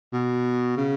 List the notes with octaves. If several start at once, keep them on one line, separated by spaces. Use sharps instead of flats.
B2
C#3